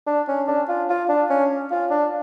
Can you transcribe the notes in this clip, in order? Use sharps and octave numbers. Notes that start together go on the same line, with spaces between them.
D4
C#4
D4
F4
F4
D4
C#4
F4
D4